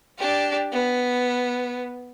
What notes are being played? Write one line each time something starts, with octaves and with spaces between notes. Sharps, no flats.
D4 G4
B3